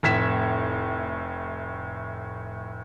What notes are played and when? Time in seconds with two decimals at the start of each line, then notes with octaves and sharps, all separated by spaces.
0.03 F1 A2 G#6 B6 E7